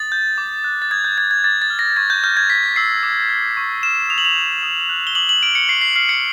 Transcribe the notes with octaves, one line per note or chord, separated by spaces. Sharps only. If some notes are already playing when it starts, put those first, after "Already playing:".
Already playing: D#6 A6
G6
D6
F#6
A6
D#6 G#6
G6
G6 G#6
G#6
D6 A6
A6
F6
A#6
C#6 G#6
G6
F6 G6
G#6
G6 B6
E6 C7
D6
F6
C#6
F6 E7
D#6 F7
F#7
F7
G6
D#6
F#6
G7
D6 F#7
F#7
F6 D7
C#7
C#6 C7
C7
F6 C7
C#7